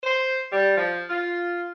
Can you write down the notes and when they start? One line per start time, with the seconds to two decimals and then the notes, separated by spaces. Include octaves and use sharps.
0.03 C5
0.52 G3
0.77 F3
1.10 F4